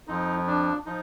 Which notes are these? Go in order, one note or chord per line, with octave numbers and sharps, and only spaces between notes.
F2 F3 D#4
D4
F3 D#4